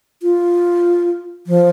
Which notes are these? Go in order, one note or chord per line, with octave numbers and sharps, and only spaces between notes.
F4
F3